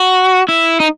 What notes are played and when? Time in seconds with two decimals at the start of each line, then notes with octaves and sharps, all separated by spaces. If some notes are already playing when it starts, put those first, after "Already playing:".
Already playing: F#4
0.49 E4
0.80 D#4